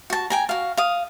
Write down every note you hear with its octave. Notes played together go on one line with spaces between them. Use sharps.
F#4 A5
G5 G#5 A#5
F#4 F5
F5 D#6